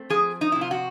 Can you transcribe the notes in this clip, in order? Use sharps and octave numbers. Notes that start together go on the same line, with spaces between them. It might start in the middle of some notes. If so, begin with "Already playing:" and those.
Already playing: A3 C4
F3 G#4
D#4
C3 E4
F4
F#4